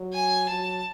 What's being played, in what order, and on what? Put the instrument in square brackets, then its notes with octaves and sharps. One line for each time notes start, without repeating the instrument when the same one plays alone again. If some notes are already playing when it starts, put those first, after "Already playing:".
Already playing: [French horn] F#3
[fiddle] G#5
[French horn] F#3 [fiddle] A5